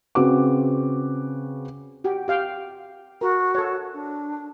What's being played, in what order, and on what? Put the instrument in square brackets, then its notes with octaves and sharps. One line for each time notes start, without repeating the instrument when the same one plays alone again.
[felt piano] C#3 C4 F#4 B4 D6
[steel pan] F#4 G4
G4 F5 G5
[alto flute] F#4 [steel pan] A#4
[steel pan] A4 C#5
[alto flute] D4